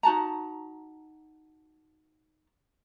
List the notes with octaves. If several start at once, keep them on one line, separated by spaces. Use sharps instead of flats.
D#4 F#4 A5 A#5